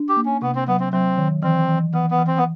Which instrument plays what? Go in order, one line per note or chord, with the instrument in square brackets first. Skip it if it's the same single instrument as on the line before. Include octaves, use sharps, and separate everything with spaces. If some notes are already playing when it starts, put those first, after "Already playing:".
Already playing: [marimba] D4
[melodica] G4
[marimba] A#3
[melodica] C#4
[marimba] C3 [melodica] B3
[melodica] C4
[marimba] F#3 [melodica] B3
[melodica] C4
[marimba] F#3 [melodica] C4
[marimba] D#3
[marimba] E3 [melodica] C4
[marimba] E3
[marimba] E3 [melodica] B3
[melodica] B3
[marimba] E3
[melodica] C4
B3